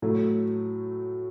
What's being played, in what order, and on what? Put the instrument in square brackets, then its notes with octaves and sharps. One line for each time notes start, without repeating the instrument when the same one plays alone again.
[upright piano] A2 F#3 A3